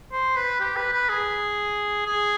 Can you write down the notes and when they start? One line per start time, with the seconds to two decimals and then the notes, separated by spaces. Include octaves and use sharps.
0.12 C5
0.36 B4
0.60 G4
0.76 B4
0.93 B4
1.09 G#4
2.06 G#4